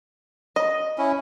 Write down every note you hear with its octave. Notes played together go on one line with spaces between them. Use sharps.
D#5
C#4 E4